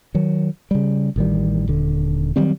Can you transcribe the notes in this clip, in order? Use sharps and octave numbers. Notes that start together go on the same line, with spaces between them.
D#3 F#3
C#3 G3
A1 D#3 G3
D#1 D3
D#3 F#3 G3 C4